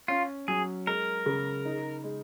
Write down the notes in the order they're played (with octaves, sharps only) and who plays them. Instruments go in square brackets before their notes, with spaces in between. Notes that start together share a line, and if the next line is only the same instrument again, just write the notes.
[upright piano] C#4 [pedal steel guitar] F4
[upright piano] F#3 [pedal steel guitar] G#4
[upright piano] G#3 [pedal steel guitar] A#4
[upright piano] C#3
D#4
G#3